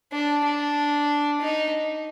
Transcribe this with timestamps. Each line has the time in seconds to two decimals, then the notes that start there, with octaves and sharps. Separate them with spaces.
0.12 D4
0.44 D4
1.41 D#4